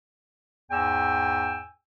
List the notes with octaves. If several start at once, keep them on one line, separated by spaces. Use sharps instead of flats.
E2 G#2 G5 G#5 E6